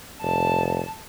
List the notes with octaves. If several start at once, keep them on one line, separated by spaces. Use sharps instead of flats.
F1 A5